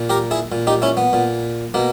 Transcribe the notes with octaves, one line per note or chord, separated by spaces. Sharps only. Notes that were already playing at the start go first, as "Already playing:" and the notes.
Already playing: A#2
G4 A#4
E4 G#4
A#2
D#4 G4
C#4 E4
B3
A#2
B2 A#3